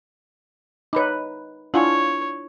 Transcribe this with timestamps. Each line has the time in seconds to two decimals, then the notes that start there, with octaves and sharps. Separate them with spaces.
0.93 D#4 B4 C#5 B5 D6
1.74 D4 E4 F4 C#5 F#5 G#5